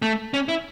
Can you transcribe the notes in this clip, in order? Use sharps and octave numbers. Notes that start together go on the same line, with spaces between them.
A3
C#4
E4